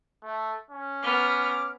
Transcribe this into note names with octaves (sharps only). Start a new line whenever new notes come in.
A3
C#4
B3 A#5 D6 F6